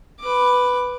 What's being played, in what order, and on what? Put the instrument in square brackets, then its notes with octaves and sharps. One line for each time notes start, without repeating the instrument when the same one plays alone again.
[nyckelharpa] B4 D6